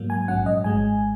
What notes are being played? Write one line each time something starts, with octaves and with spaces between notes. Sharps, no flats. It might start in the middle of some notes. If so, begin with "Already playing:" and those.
Already playing: G#2 F#3 A#3
G#5
A#1 G#2 F#3 C#4 F#5
D#5
G#1 G#2 G#3 G#5